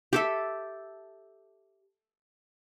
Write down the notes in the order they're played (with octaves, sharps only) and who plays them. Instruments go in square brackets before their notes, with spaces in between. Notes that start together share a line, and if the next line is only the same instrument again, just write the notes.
[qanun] G4 A4 E5